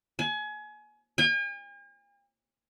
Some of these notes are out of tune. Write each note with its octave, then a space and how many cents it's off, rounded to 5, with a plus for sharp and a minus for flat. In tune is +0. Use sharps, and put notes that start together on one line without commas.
G#5 +30
G#5 -45